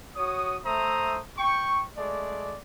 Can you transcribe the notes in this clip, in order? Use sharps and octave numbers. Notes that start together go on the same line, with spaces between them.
F#4 C#5 D#6
A3 C5 E5 A#5 D#6
G5 C#6
G#3 A3 D5